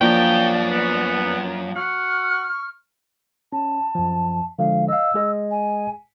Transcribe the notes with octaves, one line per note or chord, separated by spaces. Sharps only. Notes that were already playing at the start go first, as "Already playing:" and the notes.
F#2 F3 A#3 D4 D5 G5
B3
F#4 C#6 F6
C#4 A5
F#2 F3
D3 F3 G#3 F5
D#5 F5 E6
G#3 G#4 D#5
G#5